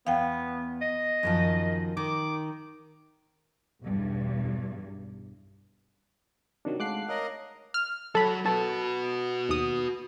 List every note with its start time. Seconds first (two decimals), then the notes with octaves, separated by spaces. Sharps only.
0.07 E2 B3 F5 G5
0.82 D#5
1.23 F#2 D#3 F3
1.97 D#3 D6
3.82 B1 E2 G2
6.65 C3 D#3 F#3 D4
6.80 G#3 A3 F5 F#5 A5 D6 F#6 C7
7.09 A#4 C#5 D#5 F5
7.74 F6
8.15 F#3 A4 B5
8.46 F#4 A4 B4
9.49 D#2 D#6